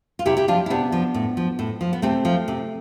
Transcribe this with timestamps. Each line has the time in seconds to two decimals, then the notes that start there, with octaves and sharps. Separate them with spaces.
0.19 F4
0.26 C3 E4 G4
0.37 E4 G4
0.48 F3 D4 F4
0.66 E4
0.70 C3 B3 D4
0.92 F3
1.14 A2
1.37 F3
1.59 A2
1.81 F3
1.93 B3
2.02 C3 A3 C4
2.25 F3
2.48 C3